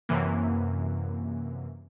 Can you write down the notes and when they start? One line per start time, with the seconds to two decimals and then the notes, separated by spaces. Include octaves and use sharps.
0.09 F#2 C3 E3 A#3